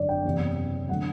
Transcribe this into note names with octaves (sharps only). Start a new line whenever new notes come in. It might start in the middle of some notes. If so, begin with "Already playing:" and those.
Already playing: G#1 F#2 D3 C#5 D5
G5
F#1 E2 C3
D3 F#3 A3 F#5